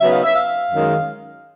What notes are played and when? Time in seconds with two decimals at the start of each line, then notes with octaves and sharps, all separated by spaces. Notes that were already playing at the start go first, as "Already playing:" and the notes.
0.01 C#3 F#3 B3 D#4 E5
0.12 F5
0.24 E5
0.36 F5
0.70 F#2 D#3 G#3